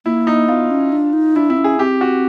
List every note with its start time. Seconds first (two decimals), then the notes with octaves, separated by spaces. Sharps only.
0.05 A#3 E4
0.27 D#4
0.48 B3 F4
0.70 C#4
0.92 D4
1.13 D#4
1.36 D4 E4
1.50 C4 E4
1.57 C#4
1.64 G#4
1.79 C4 G4
2.01 F#4